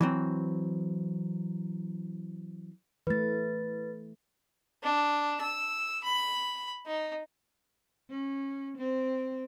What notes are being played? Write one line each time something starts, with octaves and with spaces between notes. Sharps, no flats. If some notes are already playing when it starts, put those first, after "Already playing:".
E3 F#3 C4
E3 A3 B4 A6
D4
E6
B5
D#4
C#4
C4